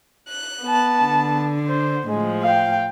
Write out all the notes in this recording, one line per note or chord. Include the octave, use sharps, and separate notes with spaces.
F#6
B3 A5
D3
C5
A2 F3 G#3
F5 G5